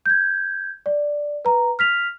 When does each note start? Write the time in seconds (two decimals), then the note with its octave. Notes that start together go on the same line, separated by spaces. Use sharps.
0.06 G6 G#6
0.86 D5
1.45 B4 A#5
1.79 F6 B6 F7